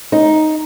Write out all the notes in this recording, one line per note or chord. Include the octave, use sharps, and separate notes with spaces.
D#4